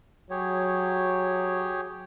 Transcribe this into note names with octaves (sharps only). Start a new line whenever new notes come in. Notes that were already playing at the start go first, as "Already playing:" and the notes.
F#3 G4 G#4 C#5